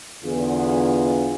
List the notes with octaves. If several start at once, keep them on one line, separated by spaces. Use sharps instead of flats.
E2 D3 B3 F4 G#4